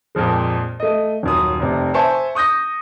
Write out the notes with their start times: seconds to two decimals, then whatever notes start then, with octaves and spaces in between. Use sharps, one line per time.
0.15 F2 A#2 F3 G#3
0.80 A3 D#5
1.23 D#1 F#2 D#6
1.60 F1 C3
1.94 C5 E5 G#5 A5 C#6
2.35 C#6 D#6 G6 A#6